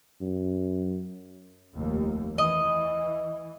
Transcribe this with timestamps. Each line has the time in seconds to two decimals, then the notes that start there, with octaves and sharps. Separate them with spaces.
0.21 F#2
1.74 F1 D#2
2.38 E3 D#5